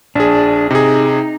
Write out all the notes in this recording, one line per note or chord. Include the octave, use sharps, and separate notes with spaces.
A#1 D4 G#4
C3 D#4 G#4